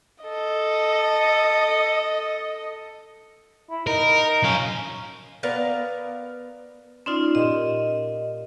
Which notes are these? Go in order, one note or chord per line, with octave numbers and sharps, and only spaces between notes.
A4 D#5
E4
D#4 A#4
F#3 C#4 F5
B3 A#4 D5 F5
C#4 D#4 F4 D5 C6
A#2 G4 D#5 E7